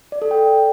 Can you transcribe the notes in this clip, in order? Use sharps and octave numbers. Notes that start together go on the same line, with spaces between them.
D5
A4
G5